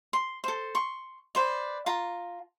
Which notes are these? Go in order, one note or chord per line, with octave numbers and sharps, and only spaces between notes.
C6
A4 C5
C6 C#6
B4 C5 D5
F4 A5 A#5